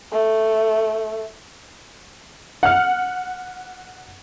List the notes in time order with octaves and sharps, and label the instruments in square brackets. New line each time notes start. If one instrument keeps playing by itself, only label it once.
[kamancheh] A3
[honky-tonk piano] F#5 F6